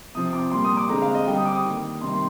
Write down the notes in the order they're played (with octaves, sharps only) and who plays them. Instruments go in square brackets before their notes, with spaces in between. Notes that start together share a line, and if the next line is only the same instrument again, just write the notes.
[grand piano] C3 F3 C4 D#6
D6
A#2 G3 A#3 C6
D#6
D6
D3 G#3 C4 A#5
F5
D#5
D3 G3 C4 G5
D#6
D6
D#6
D#3 A#3
C3 D#3 G3 A#3 C6
C6